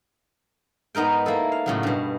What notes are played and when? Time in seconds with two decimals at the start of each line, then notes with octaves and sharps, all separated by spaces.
0.95 G#2 B3 D#4 A#4 G5
1.26 A#3 E4 A4
1.52 F5
1.66 A2 C#3 F#3
1.83 G2 B2